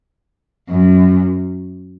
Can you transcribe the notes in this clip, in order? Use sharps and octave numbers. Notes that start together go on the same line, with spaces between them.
F#2